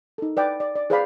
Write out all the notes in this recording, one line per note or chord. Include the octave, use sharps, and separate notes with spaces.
D#4 A4
B4 D5 G5
D5
D5
G#4 B4 C5 D5 F5 B5